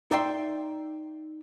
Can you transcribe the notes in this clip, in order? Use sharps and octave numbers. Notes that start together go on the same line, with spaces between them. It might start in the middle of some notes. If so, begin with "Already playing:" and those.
D#4 D5 E5 G5 C6